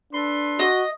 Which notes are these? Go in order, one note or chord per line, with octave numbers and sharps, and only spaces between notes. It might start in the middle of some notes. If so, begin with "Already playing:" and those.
D4 A4 B4 C6
F#4 D#5